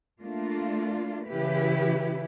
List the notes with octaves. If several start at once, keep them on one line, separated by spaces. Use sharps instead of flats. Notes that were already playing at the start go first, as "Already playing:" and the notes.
A3 A#3 D4 F4
C#3 E3 E4 G4 B4